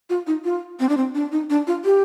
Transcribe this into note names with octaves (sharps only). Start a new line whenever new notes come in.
F4
D#4
F4
C4
D4
C4
D4
D#4
D4
F4
G4